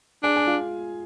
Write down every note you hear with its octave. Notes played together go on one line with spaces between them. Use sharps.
D4 G#4 G#5
G#5
F4 F5